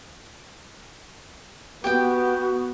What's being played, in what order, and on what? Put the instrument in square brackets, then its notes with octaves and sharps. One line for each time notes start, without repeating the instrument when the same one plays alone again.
[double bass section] B3 [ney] F#4 [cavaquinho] G4 G5